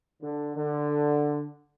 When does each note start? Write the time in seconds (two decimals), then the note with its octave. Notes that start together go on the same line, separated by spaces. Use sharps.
0.22 D3
0.56 D3